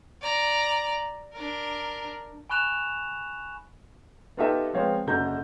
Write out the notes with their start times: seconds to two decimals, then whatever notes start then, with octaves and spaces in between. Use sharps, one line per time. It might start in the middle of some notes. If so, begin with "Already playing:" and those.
0.21 D5 A#5
1.33 D4 A#4
2.50 G#5 B5 C#6 F#6 E7 F7
4.37 B3 D#4 F4 G4 A4 E5
4.73 F3 G#3 B3 C4 C#5 F5
5.07 F#1 F#2 D3 A#5 G6